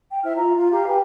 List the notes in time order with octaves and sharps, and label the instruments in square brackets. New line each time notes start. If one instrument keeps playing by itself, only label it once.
[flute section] G5
E4 C5 E5 F6
F4 A#5
F4
G4 F5 A#5
G4 B4 G5 G#5